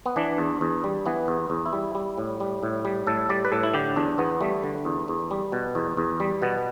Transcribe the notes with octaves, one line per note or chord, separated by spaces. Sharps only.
B3
E3 D4
E2
E2
G3
E3 B3
E2
E2
E4
G3
G3
A2
G3
A2
G3
A2 A4
G3 D5
B4
A2 A4
E4
D3 G4
E2 D4
E2 B3
G3 A3
D3
E2
E2
G3
B2
E2
E2
G3
B2 B3